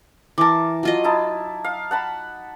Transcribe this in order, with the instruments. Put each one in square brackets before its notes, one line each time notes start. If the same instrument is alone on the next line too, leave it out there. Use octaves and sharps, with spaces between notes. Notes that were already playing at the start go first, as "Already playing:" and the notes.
[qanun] E3 A#4 [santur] A5 D6
[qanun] F#3 F4 D#5
[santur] D#4 E4 A5
F5
F#5 A5 B5